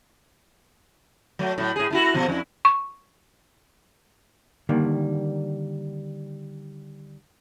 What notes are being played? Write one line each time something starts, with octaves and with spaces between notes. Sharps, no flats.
F#3 A3
A2 F#3
A2 G#4
A3 E4 F#4
B2 F3
F2 E4
C#6
D3 D#3 G3 A#3